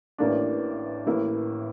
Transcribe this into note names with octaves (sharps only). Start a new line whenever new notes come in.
A1 A2 E3 A#3 D4
A1 A2 E3 A#3 E4